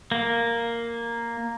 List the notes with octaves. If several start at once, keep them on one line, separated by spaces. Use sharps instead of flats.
A#3